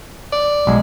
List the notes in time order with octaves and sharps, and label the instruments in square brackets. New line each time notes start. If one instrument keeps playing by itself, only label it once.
[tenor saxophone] D5
[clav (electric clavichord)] B1 [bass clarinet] G#3